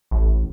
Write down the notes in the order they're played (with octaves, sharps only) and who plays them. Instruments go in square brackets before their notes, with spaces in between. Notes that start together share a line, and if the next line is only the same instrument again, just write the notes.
[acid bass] A1